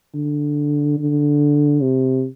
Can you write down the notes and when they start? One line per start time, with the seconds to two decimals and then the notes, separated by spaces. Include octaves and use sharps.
0.14 D3
0.98 D3
1.82 C3